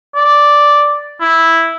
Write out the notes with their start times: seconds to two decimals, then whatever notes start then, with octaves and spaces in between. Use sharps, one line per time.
0.16 D5
1.21 E4